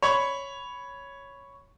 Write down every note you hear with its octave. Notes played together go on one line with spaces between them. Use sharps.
C#5 B5 C#6